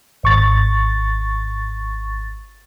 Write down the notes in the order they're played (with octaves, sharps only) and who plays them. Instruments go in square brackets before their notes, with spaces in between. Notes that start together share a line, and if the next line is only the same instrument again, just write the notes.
[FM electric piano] G#1 C#6 A6